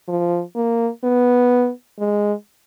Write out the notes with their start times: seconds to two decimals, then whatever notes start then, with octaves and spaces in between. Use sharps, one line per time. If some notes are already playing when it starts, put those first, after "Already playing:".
0.08 F3
0.55 A#3
1.03 B3
1.99 G#3